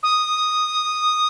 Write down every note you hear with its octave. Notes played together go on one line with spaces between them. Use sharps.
D#6